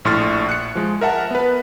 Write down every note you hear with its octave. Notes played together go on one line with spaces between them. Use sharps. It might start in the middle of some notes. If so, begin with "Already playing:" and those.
A#1 A2 C6 C#6 F6 A6
F#6 C#7
F3 G#3
A#4 E5 F#5 A5
B3 B4